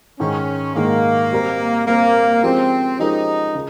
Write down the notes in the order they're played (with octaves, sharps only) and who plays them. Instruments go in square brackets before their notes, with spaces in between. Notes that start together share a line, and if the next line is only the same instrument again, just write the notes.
[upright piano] G#2 D#3 G#3 [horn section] C#4
[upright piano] G#2 D#3 G#3 [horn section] A#3
[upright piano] G3 C4 G4 A#4
[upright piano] G3 C4 G4 A#4 [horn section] A#3
[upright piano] F3 G#3 C#4 G4 A#4 [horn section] C4
[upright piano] F3 G#3 C#4 G4 A#4 [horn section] D#4
[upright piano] C#3